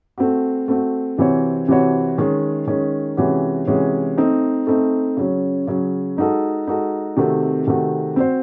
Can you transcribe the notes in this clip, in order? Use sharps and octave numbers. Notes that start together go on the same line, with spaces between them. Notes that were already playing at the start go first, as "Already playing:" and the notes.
A3 C4 F#4
A3 C4 F#4
C3 E3 C4 F#4 C#5
C3 E3 C4 F#4 C#5
D#3 G#3 C#4
D#3 G#3 C#4
C3 E3 G#3 C#4 F#4
C3 E3 G#3 C#4 F#4
A3 C4 D#4
A3 C4 D#4
C#3 F#3 C#4
C#3 F#3 C#4
G#3 D#4 F#4 A4
G#3 D#4 F#4 A4
C3 D#3 A3 C4 F#4
C3 D#3 A3 C4 F#4
C4 F#4 C5